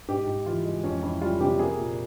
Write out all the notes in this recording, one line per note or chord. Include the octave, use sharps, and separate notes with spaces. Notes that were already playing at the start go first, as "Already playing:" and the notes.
G#2 G4
G#2
E3 F4
G#3
F2 C#4
F2 E4
G3 F4
C3 G4
A#3 G#4
A#2